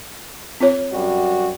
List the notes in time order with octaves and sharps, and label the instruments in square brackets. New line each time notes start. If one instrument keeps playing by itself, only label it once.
[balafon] C4 F4 C#5
[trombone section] F#2 G3 F#4